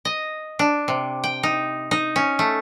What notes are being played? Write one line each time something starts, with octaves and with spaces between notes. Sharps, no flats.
D#5
D4
C3
G5
D#4
D#4
C#4
A3